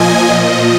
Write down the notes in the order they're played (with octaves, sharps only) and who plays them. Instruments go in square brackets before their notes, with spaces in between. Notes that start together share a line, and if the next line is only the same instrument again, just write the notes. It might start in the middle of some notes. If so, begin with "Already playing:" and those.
Already playing: [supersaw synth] A#2 F3 D#5 G#5
A#2 F3